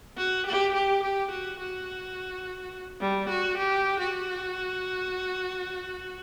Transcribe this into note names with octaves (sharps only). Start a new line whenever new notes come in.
F#4
G4
G4
G4
F#4
F#4
G3
F#4
G4
F#4